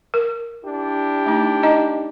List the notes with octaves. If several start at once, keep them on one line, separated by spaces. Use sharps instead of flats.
A#4
D4 E4 G4
A3 D#4
D#4 D#5 A#5